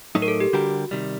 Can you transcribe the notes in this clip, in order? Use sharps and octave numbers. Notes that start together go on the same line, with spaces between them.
A2 F#3 A3 D#4
A#4
A4
G4
D3 G3 D4 F#4 G4 A#4
C3 D#3 G3